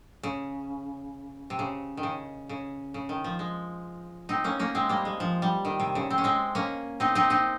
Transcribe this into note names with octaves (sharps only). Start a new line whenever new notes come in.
C#3
C3
C#3
D#3
C#3
C#3
C#3
D#3
F3
G#3
C4 D#4
A#3 C#4
A#3 C#4
G#3 C4
G3 A#3
G#3
F3
G3
D#3
C3
C#3
C4
C#4
G#3 C4
A#3 C#4
C4 D#4
C4 D#4
C4 D#4